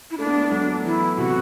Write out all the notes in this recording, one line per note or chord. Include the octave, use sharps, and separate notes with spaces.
E4
A3 D4
B3
A3
F#3
E3 E4
C3 F#4